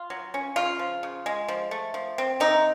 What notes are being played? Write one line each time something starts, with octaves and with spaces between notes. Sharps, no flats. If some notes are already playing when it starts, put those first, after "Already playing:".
Already playing: F4
F#3
C#4
C#3 F4
F3
C#3
G#3
F3
A3
F3
C4
C3 D#4